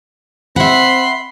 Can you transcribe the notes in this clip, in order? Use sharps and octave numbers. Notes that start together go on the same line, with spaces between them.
C4 E5 F#5 B5 C6